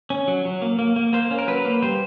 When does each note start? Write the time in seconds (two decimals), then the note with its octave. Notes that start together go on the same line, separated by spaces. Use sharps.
0.10 C#4
0.28 F#3
0.45 F#3
0.62 A#3
0.79 A#3
0.96 A#3
1.13 A#3 C5
1.31 C#4
1.38 A#4
1.48 F#3 B4
1.65 A#3
1.82 G3 C5